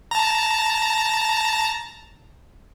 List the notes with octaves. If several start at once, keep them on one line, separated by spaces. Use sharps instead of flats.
A5 A#5